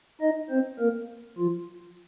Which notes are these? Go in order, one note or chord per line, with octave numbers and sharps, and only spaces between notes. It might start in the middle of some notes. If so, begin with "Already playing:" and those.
D#4 D#5
C4 C5
A#3 A#4
F3 F4